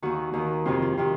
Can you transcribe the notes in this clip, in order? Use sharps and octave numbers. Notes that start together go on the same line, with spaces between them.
D#2 D#3 F#4
D#2 D#3
F2 C3 D#3 F4
F4
C3 D#3 F4